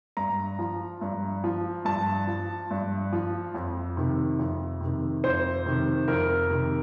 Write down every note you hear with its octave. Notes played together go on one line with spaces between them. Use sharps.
G2 A#5
F3
G2
F3
G2 A5
F3
G2
F3
F2
C3 D#3
F2
C3 D#3
F2 C5
C3 D#3
F2 A#4
C3 D#3